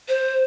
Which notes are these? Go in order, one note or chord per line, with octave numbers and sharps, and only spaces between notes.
C5